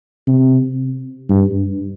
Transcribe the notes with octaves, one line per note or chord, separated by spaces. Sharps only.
C3
G2